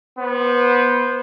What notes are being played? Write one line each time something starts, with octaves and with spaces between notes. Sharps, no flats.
B3 C5